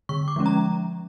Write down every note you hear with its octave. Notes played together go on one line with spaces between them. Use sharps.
D3 C#6
D6
F3 G#3 C#4
A#5